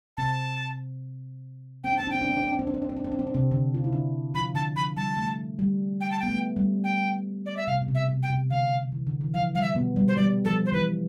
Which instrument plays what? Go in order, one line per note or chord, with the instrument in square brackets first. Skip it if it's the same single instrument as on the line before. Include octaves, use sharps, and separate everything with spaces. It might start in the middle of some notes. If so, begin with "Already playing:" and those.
[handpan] C3 C4 [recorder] A5
[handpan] C4 [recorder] G5
[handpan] D4
[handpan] C4 [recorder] A5
[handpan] D4
[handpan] C4 [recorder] G5
[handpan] D4
C4
D4
C4
D4
C4
D4
C4
D4
C4
D4
C4
D4
C4
D4
C3 C4
D3 D4
F4
E4
D3 D4
[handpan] F3 F4 [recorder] B5
[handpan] D3 D4 [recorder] A5
[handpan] F3 [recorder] B5
[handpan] G3 [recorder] A5
[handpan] A3
G3
[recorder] G5
A5
[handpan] B3 [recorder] G5
[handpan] A3
G3
[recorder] G5
D5
E5
[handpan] C3 [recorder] F5
[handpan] B2
C3
[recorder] E5
[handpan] C3
[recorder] G5
[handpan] C3
[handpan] D3 [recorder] F5
[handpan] E3
D3
E3
[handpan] F3 [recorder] F5
[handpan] G3 [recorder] F5
[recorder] E5
[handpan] B2 B3
G3
[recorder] C5
[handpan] G3 [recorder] D5
[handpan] F3 [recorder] A4
[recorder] C5
[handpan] E3 [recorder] B4